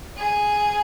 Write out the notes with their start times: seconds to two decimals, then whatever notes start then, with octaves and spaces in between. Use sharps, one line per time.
0.17 G#4